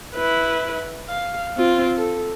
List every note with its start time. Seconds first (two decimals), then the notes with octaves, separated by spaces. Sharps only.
0.15 E4 B4
1.09 F5
1.57 C4 F4
1.97 A4